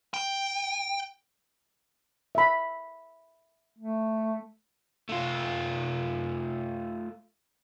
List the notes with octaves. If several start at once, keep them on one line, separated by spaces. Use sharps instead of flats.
G5
E5 B5
A3
A3 F4